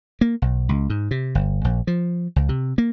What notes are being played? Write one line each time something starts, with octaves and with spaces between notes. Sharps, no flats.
A#3
B1
C#2
G#2
C3
G1
A#1
F3
C#2
C3
A#3